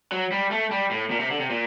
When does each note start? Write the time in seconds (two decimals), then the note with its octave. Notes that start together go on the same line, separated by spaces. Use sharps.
0.12 F#3
0.32 G3
0.51 A3
0.71 G3
0.91 A2
1.11 A#2
1.20 C3
1.30 D3
1.40 C3
1.50 A#2